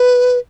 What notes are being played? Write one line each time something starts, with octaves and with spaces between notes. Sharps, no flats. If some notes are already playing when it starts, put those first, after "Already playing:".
Already playing: B4